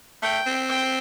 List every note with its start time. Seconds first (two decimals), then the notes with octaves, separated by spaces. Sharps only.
0.23 A3 G5
0.46 C4
0.69 G5